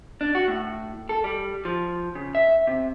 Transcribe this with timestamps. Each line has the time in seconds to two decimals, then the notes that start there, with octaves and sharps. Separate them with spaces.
0.21 D4
0.35 F#4
0.48 A2
1.09 A4
1.24 G3
1.65 F3
2.15 C#3
2.35 E5
2.67 C3